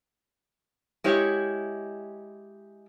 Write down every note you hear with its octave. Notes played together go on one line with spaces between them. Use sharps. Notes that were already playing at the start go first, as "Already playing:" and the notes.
G#3 E4 G4 C#5